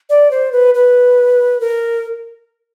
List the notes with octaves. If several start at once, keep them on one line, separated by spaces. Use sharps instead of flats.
D5
C5
B4
B4
A#4